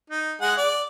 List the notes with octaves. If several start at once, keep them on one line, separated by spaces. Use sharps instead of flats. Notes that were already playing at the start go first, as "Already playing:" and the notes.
D#4
G#3 G#4 F#5
D5